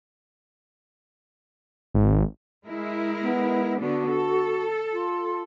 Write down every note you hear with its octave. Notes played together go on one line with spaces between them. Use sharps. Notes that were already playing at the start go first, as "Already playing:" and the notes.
G#1
G#3 E4 A#4
B3
D3 B3 D4 F#4
A4
F4